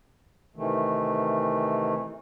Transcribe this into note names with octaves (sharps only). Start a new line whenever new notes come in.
C3 D#3 E3 A3